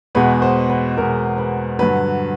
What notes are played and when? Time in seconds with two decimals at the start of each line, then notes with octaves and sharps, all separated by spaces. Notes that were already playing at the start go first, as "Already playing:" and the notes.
0.15 E2 B2 G#3 B3 B4
0.42 C5
0.70 B4
0.97 E2 B2 G#3 B3 A#4
1.38 B4
1.79 G2 D3 F#3 B4